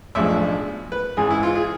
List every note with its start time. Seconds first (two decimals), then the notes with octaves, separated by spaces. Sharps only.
0.15 B1 A2 F3 G#3 D4 E5
0.92 B4
1.17 G#1 G#2 E3 G#4
1.30 E4
1.43 F4
1.55 G#4